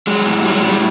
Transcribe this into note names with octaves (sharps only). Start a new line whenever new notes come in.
F#3 G#3
A2
F#3 G3
G#3
A2 G3